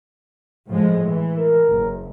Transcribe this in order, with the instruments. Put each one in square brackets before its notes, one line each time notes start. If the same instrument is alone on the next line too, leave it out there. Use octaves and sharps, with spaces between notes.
[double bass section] A2 F3 G#3
E3
[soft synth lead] A#4
[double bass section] F#1